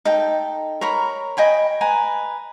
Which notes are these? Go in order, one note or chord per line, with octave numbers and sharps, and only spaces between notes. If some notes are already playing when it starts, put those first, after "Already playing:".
D#4 A4 G5
A#4 C#5 A#5 B5
D#5 G5 G#5 B5
B4 G#5 A#5